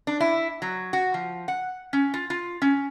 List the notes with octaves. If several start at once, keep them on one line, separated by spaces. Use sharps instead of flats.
D4
E4
F#3
F#4
F3
F#5
C#4
F4
F4
C#4